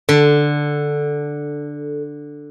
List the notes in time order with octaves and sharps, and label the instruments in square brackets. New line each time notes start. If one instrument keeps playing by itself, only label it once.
[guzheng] D3 [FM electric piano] A4